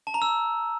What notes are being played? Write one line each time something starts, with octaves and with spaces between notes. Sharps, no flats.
A5
A#5
E6